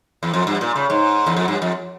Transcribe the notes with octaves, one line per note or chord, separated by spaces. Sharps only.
E2
F2
G2
A#2
C#3
G#2
E2
F2
G2
F2